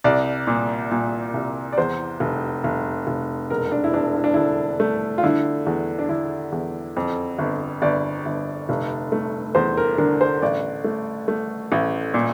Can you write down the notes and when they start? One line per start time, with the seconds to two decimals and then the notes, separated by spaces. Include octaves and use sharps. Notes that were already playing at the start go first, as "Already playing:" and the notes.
0.04 C2 D5
0.47 A#2
0.91 A#2
1.34 C2
1.73 D5
1.78 E2 C5
2.20 F1
2.64 F1
3.07 F1
3.50 E1 A#4
3.72 D4
3.84 E4
3.93 E1 D4
4.15 E4
4.24 D4
4.34 D3 E4
4.80 A3
5.18 F4
5.23 D3 E4
5.66 E2
5.99 D4
6.09 D3 E4
6.52 E2
6.96 F2
7.39 G1
7.82 G1 D5
8.26 G1
8.69 F1
9.12 A3
9.55 E2 C5
9.77 A#4
9.98 D3 A#4
10.21 C5
10.42 A1 D5
10.84 A3
11.28 A3
11.72 A1
12.14 A#2